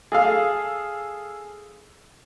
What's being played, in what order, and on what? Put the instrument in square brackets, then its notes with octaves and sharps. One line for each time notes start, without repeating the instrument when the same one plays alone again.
[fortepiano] G#4 A4 F5